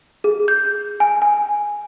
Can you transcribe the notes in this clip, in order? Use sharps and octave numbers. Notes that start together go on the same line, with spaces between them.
G#4
G6
G#5
G#5